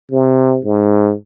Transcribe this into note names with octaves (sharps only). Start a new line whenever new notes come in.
C3
G#2